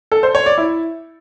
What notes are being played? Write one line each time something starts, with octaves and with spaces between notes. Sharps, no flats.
A4
C5
C#5
D5
E4